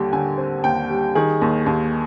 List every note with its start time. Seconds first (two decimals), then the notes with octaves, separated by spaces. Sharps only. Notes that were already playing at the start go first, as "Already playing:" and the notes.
Already playing: D#2 D3 G3 G5
0.13 D3 G#5
0.37 C4
0.64 D#2 G5
0.90 G3
1.15 D#3 G#4
1.42 D#2
1.66 D#2